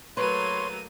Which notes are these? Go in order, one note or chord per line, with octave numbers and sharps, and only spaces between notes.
F#3 A3 A#3 B4 C#5 C6 D#7